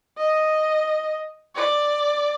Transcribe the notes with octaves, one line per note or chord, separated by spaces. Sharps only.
D#5
D5